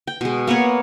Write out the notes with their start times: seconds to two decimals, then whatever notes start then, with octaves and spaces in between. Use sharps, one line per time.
0.07 G5
0.21 B2 G#3
0.47 A#3 B3 B4 C#5